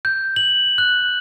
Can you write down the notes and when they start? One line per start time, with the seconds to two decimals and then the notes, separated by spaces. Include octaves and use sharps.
0.05 G6
0.36 F#7
0.78 F#6